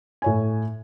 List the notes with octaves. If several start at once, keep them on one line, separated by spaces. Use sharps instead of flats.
A2 C#5 G#5